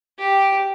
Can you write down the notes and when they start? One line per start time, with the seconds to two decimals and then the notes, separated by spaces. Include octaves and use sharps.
0.18 G4